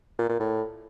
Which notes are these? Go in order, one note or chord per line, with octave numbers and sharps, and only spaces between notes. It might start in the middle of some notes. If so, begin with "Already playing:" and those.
A#2
A#2
A2